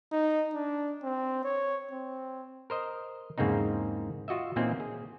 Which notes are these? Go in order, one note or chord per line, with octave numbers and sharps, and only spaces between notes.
D#4
D4
C4
C#5
C4
A#4 C5 D#5
E2 G#2 C#3 A#3 C4 D#4
F4 F#4 D#5 E5
A#2 E3 A#3 C4 C#4 D#4
G#4